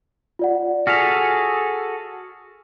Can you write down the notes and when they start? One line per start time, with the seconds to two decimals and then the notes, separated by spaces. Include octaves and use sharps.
0.39 F4 D5 F#5
0.87 F#4 G#4 A4 F6 B6 F7